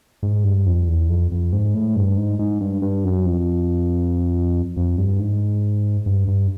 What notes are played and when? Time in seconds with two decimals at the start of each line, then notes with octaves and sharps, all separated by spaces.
0.23 G#2
0.44 G2
0.66 F2
0.88 E2
1.09 F2
1.31 F2
1.53 G#2
1.74 A2
1.96 G2
2.17 G#2
2.39 G#2
2.61 G2
2.82 G2
3.04 F#2
3.25 F2
4.77 F2
4.98 G2
5.19 G#2
6.06 G2
6.28 G2